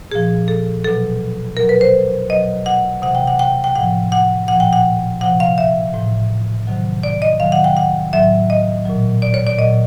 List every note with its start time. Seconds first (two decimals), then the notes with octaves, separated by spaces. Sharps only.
0.11 A#2 F3 G#4
0.48 A4
0.84 B2 F#3 A4
1.57 B2 F#3 A#4
1.69 B4
1.81 C5
2.30 B2 F#3 D#5
2.66 F#5
3.02 C3 E3 F#5
3.15 G5
3.27 F#5
3.39 G5
3.64 G5
3.75 A2 F3 F#5
4.12 F#5
4.48 A#2 F3 F#5
4.60 G5
4.73 F#5
5.21 C3 F3 F#5
5.40 F5
5.58 E5
5.94 A2 E3
6.67 C3 D#3 F#3
7.03 D5
7.22 D#5
7.40 C3 D#3 F#3 F5
7.52 F#5
7.64 G5
7.77 F#5
8.13 A2 F#3 E5
8.50 D#5
8.85 A#2 F#3
9.22 D5
9.34 C#5
9.47 D5
9.58 A#2 F#3 D#5